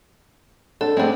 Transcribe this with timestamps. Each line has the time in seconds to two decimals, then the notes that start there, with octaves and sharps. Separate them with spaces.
0.81 D4 A4
0.97 G#3 A3 C4 D4